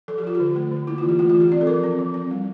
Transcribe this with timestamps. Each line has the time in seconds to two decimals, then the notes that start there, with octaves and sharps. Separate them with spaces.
0.08 F3 A4
0.18 G4
0.24 F3 F4
0.35 G4
0.40 D3
0.56 A3
0.72 D3
0.87 A#3 E4
0.98 F4
1.03 E3
1.09 G4
1.19 A3 F4
1.30 F4
1.35 E3
1.40 G4
1.52 C4 D5
1.61 A4
1.67 F3 A#4
1.83 C4
1.99 F3
2.14 C4
2.31 G3